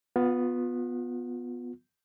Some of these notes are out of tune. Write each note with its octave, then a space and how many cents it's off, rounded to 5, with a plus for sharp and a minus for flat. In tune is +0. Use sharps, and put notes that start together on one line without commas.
B3 +0 F4 +30